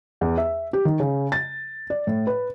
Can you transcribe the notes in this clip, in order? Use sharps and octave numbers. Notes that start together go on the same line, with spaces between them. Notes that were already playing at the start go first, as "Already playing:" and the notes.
E2
E5
G4
D#3
C#3
A6
D5
A2
B4